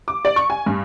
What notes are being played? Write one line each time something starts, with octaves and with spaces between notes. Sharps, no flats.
D6
D5
C#6
G#5
G2